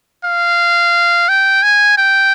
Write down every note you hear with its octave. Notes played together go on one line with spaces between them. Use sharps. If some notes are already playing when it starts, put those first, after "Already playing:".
F5
G5
G#5
G5